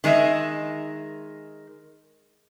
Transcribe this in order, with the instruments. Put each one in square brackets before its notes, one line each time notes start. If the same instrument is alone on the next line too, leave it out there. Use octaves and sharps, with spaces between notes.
[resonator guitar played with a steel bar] D#3 G#3 D#5 E5